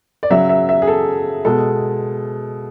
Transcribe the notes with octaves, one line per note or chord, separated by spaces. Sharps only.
D5
C#3 F#3 E5
E5
E5
G#4
A4
B2 G#3 A4